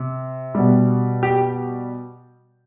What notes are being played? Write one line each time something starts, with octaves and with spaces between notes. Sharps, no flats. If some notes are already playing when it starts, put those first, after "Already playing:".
Already playing: C3
B2 G3
G4